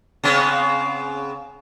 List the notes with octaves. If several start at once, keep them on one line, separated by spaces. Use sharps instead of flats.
C#3 B3 C4